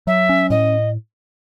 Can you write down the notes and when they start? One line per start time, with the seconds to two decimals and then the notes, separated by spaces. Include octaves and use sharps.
0.07 F#3 E5
0.29 C#4
0.50 A2 D#5